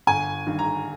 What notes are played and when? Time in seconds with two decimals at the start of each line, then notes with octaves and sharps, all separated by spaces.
0.07 G1 G#5
0.46 G2 D#3
0.59 A#5